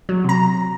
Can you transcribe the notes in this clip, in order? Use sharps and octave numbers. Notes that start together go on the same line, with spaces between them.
F#3
C3 A#5